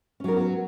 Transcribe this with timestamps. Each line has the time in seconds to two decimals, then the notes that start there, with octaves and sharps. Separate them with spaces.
0.20 C#4
0.24 F#3
0.28 A#4
0.32 B3
0.37 F#4